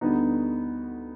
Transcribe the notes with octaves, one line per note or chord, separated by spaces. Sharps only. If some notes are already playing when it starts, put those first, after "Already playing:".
D2 D3 G3 B3 D#4